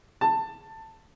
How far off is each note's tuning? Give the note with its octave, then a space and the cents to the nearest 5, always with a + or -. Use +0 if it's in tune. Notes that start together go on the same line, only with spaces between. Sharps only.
A5 +15